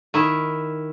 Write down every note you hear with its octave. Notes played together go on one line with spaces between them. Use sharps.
D#3 E4